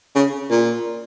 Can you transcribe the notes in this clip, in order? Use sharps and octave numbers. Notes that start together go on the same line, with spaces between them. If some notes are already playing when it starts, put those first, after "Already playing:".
C#3
A#2